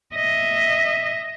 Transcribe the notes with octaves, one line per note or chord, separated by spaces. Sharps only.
D#5 E5